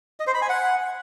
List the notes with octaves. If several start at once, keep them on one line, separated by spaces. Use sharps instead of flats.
D#5
C5
B5
G#5
F#5